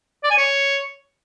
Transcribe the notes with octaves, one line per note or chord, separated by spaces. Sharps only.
D5
G#5
C#5